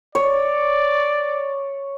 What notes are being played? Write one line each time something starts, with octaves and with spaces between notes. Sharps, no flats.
C#5 D5